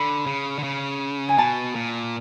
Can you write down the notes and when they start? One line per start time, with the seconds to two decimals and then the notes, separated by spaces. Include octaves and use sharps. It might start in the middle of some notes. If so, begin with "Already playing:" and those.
Already playing: D3 B5
0.26 C#3
0.59 D3
0.64 C#3
1.29 G#5
1.38 B2 A5
1.76 A#2